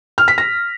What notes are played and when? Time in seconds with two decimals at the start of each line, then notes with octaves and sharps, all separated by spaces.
0.18 F6
0.28 B6
0.38 A#6